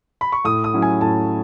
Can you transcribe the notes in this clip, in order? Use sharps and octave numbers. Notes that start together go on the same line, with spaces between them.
B5
C#6
A2 D#6
D#6
F#3 C#4 E4
G#5
A2 A5